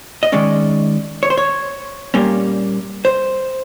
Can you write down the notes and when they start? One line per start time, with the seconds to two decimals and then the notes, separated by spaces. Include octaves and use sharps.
0.23 D#5
0.32 D#3 G#3 C#4 D5
1.23 C#5
1.30 C5
1.37 C#5
2.14 A#2 G3 A#3 C#4
3.05 C5